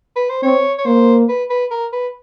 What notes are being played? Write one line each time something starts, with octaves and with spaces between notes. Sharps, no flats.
B4
C5
C4 C#5
C#5
A#3 C5
B4
B4
A#4
B4